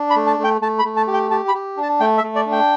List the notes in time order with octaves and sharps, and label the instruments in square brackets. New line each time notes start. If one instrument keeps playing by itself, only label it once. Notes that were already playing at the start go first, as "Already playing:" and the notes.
Already playing: [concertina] D4
B5
A3
A5
A3
G5
A3 A5
B5
A3
A5
G4
G5
G4 A5
B5
G4
D4
A5
A3 G5
E5
A3
D5
D4
G5